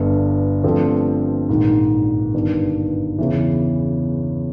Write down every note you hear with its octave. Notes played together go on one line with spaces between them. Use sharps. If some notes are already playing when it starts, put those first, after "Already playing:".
Already playing: G1 G2 D3
G2 D3 F3 A3 C4
A#1 G#2 D#3
G1 G2 D#3
E2 C#3 E3